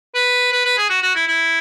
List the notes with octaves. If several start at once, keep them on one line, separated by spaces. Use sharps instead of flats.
B4
B4
B4
G#4
F#4
F#4
E4
E4